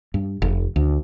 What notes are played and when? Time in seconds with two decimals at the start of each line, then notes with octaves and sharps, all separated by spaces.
0.14 G2
0.42 F1
0.76 D2